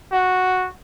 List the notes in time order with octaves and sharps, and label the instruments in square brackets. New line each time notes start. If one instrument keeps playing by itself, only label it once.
[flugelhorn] F#4